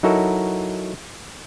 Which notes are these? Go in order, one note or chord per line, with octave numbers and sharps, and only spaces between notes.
F#3 D#4 E4 F#4 A4 A#4